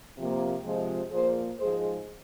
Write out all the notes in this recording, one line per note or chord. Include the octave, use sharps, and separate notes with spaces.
C3 F3 A#3
C3 F3 G#3
A#2 F3 A#3 G#4 C5
G#2 F3 G#3 G#4 C5